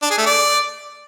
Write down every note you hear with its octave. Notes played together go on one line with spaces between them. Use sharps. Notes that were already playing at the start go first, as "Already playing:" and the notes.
D4
G#4
A3
D5